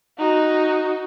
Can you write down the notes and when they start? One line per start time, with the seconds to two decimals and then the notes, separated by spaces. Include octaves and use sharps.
0.18 D#4 F#4